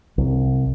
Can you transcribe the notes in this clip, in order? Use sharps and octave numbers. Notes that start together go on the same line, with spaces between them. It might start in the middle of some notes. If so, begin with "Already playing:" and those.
C2